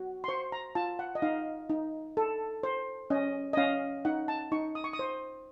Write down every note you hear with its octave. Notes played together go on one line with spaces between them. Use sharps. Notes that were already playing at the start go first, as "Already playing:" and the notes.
Already playing: F#4
C6
C5 C#6
A#5
F4 A5
F#5
D#5
D#4 F5
D#4
A4
C5
C#4 D#5
D#5
C#4 F5
D#4 F#5
A5
D#4 C#6
D#6
C#6
D#6
C5